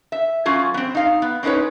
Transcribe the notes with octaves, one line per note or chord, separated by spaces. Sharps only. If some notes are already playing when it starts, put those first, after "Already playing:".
E5
F#3 C#4 F4 G#4
B3 C4
D#4 F5
B3
C4 C#4 D#4 B4 C#5